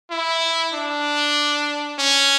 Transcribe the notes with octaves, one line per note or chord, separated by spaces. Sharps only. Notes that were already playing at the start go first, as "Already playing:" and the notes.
E4
D4
C#4